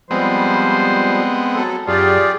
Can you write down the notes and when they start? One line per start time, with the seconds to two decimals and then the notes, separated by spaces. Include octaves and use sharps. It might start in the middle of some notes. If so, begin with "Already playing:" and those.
0.11 F3 G3 G#3 B3 C4 C5
1.55 F#3 A4
1.88 F#2 F4 G4 G#4 D5